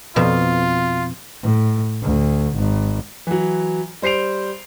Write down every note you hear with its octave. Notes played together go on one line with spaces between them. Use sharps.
F2 B2 F4
A2
D2
G#1
E3 F#3
G3 C5 C7 D7 F7